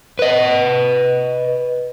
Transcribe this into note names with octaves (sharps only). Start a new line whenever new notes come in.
B4 D#5